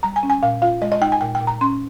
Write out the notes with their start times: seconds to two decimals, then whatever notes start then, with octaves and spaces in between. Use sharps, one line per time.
0.03 G3 A#5
0.16 G#5
0.23 C#4
0.30 G#5
0.43 A#2 F5
0.62 F4 F5
0.82 G#3 D#5
0.92 D#5
1.01 D#4 G5
1.12 G#5
1.21 A#2 G5
1.35 G5
1.40 A#2
1.47 A#5
1.61 C#4 C6